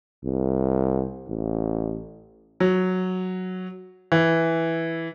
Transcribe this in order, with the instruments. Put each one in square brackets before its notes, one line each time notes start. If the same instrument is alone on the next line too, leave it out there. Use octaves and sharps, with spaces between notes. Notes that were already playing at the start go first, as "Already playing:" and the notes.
[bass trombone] C2
A1
[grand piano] F#3
E3